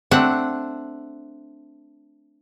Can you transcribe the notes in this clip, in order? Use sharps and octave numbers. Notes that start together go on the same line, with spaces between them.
A3 C4 D4 F#5